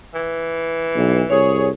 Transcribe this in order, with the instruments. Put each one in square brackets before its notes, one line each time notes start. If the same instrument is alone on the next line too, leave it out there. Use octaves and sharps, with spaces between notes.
[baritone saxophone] E3
[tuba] B1
[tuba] C2 [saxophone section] G#4 C#5